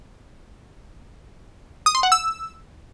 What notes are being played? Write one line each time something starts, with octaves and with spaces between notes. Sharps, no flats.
D#6
C6
F#5
E6